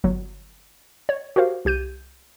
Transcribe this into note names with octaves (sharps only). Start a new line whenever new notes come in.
G1 F#3
C#5
F#4 G4 A#4 C5 F5
C2 G4 G6 D#7